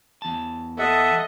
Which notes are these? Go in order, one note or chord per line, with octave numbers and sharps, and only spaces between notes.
E2 A5
A4 D#5 E5 F#5